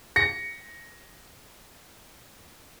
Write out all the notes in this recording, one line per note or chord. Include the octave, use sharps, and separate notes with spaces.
A#6 C#7